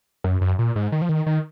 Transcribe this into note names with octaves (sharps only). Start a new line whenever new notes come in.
F#2
F#2
A#2
G#2
D#3
F3
D#3
D#3